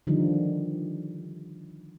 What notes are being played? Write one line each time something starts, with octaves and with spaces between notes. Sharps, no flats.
D3 D#3 F3 G3 D#4